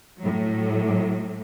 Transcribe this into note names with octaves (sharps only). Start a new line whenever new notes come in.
A2 F#3